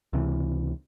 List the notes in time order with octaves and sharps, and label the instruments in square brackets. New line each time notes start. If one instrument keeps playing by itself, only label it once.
[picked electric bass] C#2 C3 E3